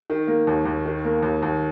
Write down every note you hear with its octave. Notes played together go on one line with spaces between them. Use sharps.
D#3
A#3
D#2
D#2
D#3
A#3
D#2
D#2